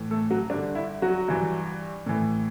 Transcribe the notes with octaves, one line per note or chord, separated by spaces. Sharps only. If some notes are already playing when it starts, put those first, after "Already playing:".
Already playing: A2 E3
A3 A4
F#3 F#4
G2 D3 D4
E4
F#3 F#4
G2 E3
A2 E3